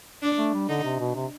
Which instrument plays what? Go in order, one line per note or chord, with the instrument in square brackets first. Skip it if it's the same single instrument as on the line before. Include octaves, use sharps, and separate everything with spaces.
[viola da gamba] D4
[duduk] A3
G3
[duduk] D3 [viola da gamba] D#4
[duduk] C3
B2
C3